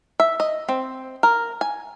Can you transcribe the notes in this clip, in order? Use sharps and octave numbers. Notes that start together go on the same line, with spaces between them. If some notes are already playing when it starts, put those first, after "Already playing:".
E5
D#5
C4
A#4
G#5